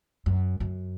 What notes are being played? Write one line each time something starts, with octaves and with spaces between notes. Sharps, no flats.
F#2
F#2